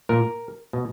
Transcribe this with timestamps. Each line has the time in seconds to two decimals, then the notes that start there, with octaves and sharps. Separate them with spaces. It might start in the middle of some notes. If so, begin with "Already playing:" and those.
0.09 A#2 A#4
0.73 B2